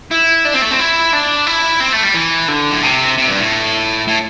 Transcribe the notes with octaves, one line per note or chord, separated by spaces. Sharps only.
E4
D4
C4
A3
C4
E4
D4
E4
C4
A3
G3
E3
D3
A2
C3
C3
G2
A2
A2